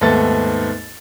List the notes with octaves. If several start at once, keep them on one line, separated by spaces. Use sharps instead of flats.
D#2 G#2 A3 B3 A4 A6